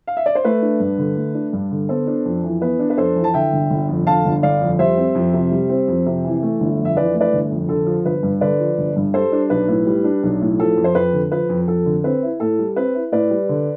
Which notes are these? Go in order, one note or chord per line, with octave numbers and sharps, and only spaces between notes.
F5
E5
D5
C5
A3 B4
D4
G2
D3
A3
D4
G2
D3
B3 A4 C5
D4
F2
E3
B3 B4
D4
B4
F2 A4 C5
E3
A5
D3 E5 G5
G1
G1
F2
D3 F5 A5
G1
G1 D5 F5
F2
G3 C5 E5
C4
F2
C3
G3
C4
F2
C3
E3
A3
G1
F2
E5
E3 B4 D5
A3
B4 D5
G1
F2
D3 A4
F3
G1 B4
G2
D3 B4 D5
F3
G1
G2
G3 A4 C5
D4
B1 B4
A2
G3
D4
B1
A2
F3 A4
F2
C5
F2 B4
D3
F3 B4
F2
F2 A4
D3
C4 B4
E4
A2 A4
G3
C4 B4
E4
A2 B4 D5
G3
D3